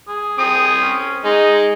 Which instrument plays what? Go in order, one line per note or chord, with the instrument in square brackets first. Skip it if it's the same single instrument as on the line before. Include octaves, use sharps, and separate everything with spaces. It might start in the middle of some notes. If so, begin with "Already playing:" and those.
[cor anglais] G#4
[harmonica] C4 D#6
[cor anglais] C#4
[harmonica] G#3 [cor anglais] D#4